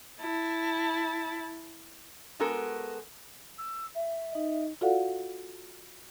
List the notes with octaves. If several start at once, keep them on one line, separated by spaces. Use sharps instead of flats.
E4 A5
G#3 B3 F#4 A4 A#4
E6
E5
D#4 D#5
F4 F#4 A4 D5 F5 F#5